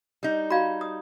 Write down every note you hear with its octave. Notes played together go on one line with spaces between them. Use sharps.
G3 D#4
F#4 F5 B5 G#6
D#6